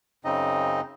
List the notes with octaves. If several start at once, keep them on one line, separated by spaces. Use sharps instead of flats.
F#2 C#3 C4 D#4 D#5